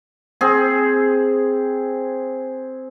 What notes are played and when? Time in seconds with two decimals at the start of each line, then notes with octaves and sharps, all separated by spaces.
0.41 C4 G#4